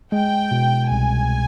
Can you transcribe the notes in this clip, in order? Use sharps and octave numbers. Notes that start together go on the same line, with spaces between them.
G#3 G5
B2
C2 G#5